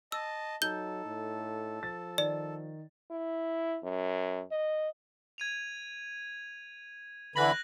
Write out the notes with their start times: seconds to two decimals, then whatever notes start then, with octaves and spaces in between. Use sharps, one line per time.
0.12 D#5 A5 E6
0.62 F#3 D#4 A4 G6 G7
1.06 A2
1.83 F3 A6
2.18 D#3 D5
3.11 E4
3.83 F#2
4.52 D#5
5.38 G#6 D#7 F7
7.36 D3 E3 B5 F#6 A#6 F#7